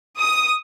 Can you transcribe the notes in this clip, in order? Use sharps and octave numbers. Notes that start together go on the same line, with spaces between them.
D#6